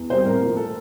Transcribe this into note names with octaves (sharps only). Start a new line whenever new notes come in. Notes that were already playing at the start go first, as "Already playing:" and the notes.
Already playing: E2
C3 G3 C4 C5
A2 A#4
F3 A#3
A4